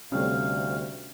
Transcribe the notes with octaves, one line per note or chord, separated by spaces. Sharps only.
D2 C3 G3 A3 C#4 F5